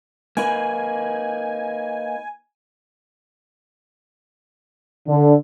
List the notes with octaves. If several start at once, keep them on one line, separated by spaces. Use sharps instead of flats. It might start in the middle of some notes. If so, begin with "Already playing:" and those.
A#3 D#4 B4 G#5
D3